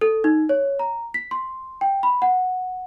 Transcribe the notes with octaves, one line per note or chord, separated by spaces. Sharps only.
A4
D#4
C#5
A#5
B6
C6
G5
B5
F#5